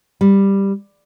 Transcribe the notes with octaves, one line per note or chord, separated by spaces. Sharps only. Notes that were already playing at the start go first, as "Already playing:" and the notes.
G3